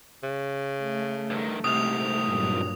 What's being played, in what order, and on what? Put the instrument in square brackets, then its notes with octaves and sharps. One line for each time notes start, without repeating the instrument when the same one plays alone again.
[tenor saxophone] C#3
[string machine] A3
[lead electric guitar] G2 D#3
[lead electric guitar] C2 G#2 [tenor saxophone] C3 [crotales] D#6 F7
[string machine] G2 A#2 F#3